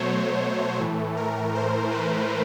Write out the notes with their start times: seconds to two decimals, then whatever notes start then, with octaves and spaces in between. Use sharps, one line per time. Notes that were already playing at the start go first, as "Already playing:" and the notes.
Already playing: B2 F#3 A3 C5 C#5
0.79 A2 E3 A3
1.17 A#4
1.55 C5
1.92 B4